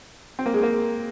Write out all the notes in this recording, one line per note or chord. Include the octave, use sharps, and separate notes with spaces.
C4
A#3
G#3
A#3